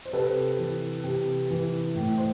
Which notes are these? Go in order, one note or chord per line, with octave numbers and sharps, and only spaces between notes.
C5
C3 A4 B4
E3
C3
E3
A2
C5